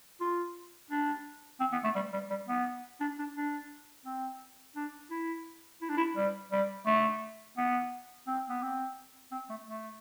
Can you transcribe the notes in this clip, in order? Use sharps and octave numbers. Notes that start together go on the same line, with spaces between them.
F4
D4
C4
B3
A3
G3
G3
G3
B3
D4
D4
D4
C4
D4
E4
E4
D4
E4
G3
G3
A3
B3
C4
B3
C4
C4
A3
A3